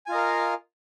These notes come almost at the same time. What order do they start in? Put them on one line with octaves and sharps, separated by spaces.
G#5 F4 D#5 A#4 F5